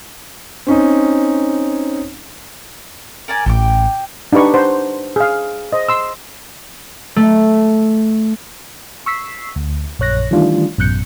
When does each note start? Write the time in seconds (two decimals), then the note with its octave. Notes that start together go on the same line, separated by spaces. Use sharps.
0.67 C4 C#4 D#4
3.28 A#4 D5 G#5
3.46 A1 G5 A5 D6
4.33 D4 D#4 G4 B4 C#6
4.54 C5 F#5
5.16 G#4 F5
5.73 C5 D#5
5.89 C6 E6
7.16 A3
9.06 C#6 E6 B6 C7
9.56 D2
9.99 A#1 F#2 C#5 F#6 A#6
10.31 D#3 E3 G3 A3 D4 F4
10.78 A1 F#2 B2 F#6 G6 C#7